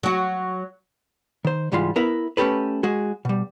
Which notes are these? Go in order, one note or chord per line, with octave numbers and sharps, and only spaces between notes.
F#3 F#4
D#3 C5
C#2 G#2 E3 G3 G#3 F4
B3 E4 A#4 B4 E5
A3 C#4 D4 G4 A4 B4
G#3 F#4 G#4
B2 G3